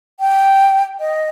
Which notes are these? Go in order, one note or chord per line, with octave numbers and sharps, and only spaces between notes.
G5
D#5